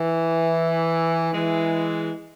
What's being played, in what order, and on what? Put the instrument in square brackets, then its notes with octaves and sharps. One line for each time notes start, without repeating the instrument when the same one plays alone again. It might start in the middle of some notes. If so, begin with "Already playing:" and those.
Already playing: [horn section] E3
E3 G#3